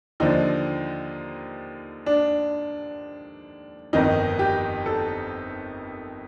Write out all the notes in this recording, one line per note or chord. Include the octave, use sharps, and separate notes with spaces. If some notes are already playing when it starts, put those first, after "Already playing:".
D#2 D3 F3 D#4
D4
G1 F2 D#3 D#4
G4
A4